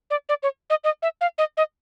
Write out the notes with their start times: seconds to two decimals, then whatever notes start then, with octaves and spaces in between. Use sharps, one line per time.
0.10 D5
0.29 D5
0.43 C#5
0.70 D#5
0.84 D#5
1.02 E5
1.21 F5
1.38 D#5
1.57 D#5